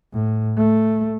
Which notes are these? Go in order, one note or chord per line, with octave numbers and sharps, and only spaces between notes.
A2
A3